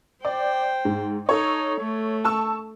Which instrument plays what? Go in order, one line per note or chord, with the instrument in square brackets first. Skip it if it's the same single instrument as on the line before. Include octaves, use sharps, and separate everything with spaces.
[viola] C5 G5 [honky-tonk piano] D5
[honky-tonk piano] G#2
[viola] D#4 [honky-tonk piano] A4 C#5
[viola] A3
[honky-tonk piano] A5 C#6 E6